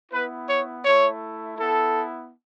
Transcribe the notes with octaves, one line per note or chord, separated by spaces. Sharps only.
B3 E4 B4
C#5
A3 E4 C#5
B3 E4 A4